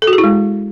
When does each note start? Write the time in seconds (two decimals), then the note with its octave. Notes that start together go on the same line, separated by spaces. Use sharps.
0.02 A4
0.07 F#4
0.13 G#4
0.18 E4
0.24 G#3